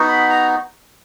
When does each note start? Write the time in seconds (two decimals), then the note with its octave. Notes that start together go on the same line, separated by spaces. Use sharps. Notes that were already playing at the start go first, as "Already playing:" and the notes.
Already playing: B3 D#4 F#4
0.08 B5
0.30 A#5